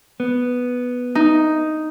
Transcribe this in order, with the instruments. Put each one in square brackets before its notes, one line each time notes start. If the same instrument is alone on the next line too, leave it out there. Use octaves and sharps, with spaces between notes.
[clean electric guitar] B3
[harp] D#4